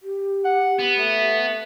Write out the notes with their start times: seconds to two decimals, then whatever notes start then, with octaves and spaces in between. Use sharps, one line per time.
0.02 G4
0.45 F#5
0.79 B3
0.95 A3